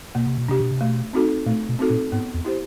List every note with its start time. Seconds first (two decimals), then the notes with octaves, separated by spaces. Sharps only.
0.15 B2 A#3
0.26 C3
0.38 B2
0.48 C3 D4 G4
0.60 B2
0.71 C3
0.81 B2 A3
1.13 C4 D#4 F#4 A4
1.46 A#2 A3
1.69 B2
1.79 C4 D#4 F#4 A4
1.90 A#2
2.12 G#2 B3
2.34 E2
2.45 E4 G4 C5